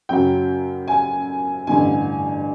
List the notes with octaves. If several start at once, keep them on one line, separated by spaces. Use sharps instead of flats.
F#2 C#3 F#3 G5
G#5
A1 G2 D3 G#5